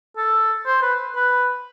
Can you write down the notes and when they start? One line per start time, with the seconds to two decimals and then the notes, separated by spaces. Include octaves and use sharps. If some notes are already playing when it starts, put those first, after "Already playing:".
0.17 A4
0.66 C5
0.82 B4
1.16 B4